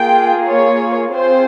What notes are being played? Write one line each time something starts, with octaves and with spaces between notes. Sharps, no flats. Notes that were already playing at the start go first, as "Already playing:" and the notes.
Already playing: A#3 F4 G#4 G5
C#5
C4 F4 G#4 C5